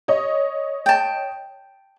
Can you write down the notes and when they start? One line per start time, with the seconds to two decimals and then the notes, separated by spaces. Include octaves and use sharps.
0.08 C#5 D#5
0.86 G5 A5